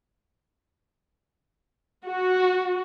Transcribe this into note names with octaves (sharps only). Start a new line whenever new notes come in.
F#4